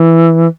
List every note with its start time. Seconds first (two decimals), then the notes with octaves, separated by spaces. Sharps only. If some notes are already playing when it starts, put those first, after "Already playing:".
Already playing: E3